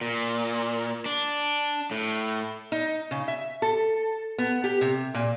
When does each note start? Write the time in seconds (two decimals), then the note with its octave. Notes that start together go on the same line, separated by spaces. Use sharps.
0.01 A#2
1.06 D4
1.91 A2
2.72 D#4
3.11 C#3
3.28 E5
3.62 A4
4.38 B3
4.64 G4
4.81 C3
5.14 A#2